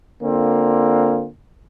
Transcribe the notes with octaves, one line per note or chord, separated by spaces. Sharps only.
D3 A#3 C4 F4